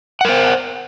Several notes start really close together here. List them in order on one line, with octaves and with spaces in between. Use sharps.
F#5 A#4 C5